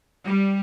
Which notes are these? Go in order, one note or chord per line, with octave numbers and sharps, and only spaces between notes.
G3